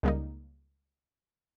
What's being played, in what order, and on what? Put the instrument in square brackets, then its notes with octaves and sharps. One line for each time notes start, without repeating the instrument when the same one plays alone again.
[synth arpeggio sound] C#2 C#3 G3 A#3 D#4